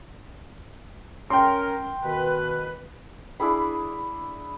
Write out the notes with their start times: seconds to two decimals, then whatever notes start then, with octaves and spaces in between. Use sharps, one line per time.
1.30 C#4 A#4 G5 C6
2.04 B2 D#3 B4
3.40 D4 E4 G#4 B5